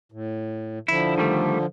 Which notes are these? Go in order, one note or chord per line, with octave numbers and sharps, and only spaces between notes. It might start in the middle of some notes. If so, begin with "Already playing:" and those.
A2
D3 F3 E4
D#3 G3 A3